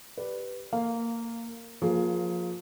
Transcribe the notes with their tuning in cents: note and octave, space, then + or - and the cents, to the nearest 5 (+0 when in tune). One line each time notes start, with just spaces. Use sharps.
G4 +0 B4 +0 D5 +0
A#3 -15 F5 +0
F3 +25 A#3 +0 G#4 +20